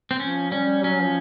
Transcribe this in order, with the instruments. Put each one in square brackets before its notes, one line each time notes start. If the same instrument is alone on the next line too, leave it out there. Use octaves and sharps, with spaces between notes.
[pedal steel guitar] C4
[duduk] F3 [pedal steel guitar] C#4
[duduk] G3 [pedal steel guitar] C#4
[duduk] F#3 [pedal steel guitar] C#4
[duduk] F3